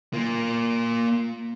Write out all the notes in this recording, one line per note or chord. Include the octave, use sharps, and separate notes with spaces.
A#3 F4